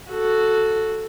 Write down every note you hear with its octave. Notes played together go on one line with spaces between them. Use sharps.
F#4 A4